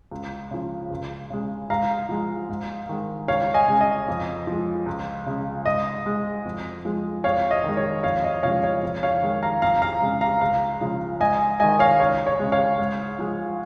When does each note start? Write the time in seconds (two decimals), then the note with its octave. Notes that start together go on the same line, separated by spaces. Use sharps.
0.11 C#2
0.51 C#3 F3
0.91 C#2
1.30 C#3 G#3
1.70 G#2 F5 A#5
2.09 F3 G#3
2.49 G#2
2.89 D#3 G#3
3.28 C#2 C#5 F5
3.54 D#5 G#5
3.68 C#3 G#3
3.81 D#5
4.08 F2
4.47 F3 G#3
4.86 C#2
5.26 C#3 G#3
5.66 G#2 D#5
6.06 G#3
6.45 F2
6.85 F3 G#3
7.24 F2 C#5 F5
7.51 D#5
7.64 D#3 G#3
7.77 C#5
8.03 F2 C#5 F5
8.24 D#5
8.43 C#3 F3 G#3 C#5 F5
8.63 C#5
8.83 F2
9.03 C#5 F5
9.23 D#3 G#3
9.43 F5 A#5
9.62 F2 F5 A#5
9.82 F5 A#5
10.02 C#3 G#3
10.21 F5 A#5
10.41 C#2 F5 A#5
10.81 C#3 F3 G#3
11.20 G#2 D#5 G#5
11.60 D#3 G#3 D#5 G#5
11.79 C#5 F5
11.99 C#2 C#5
12.27 C#5
12.39 C#3 G#3
12.52 C#5 F5
12.79 G#2
13.19 F3 G#3